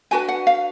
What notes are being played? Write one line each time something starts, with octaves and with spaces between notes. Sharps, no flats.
D4 F#4 B4 G#5
F#5
F5